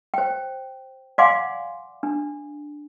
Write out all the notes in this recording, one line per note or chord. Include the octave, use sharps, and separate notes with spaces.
C5 G5
D5 F5 F#5 G#5 C6 D6
D4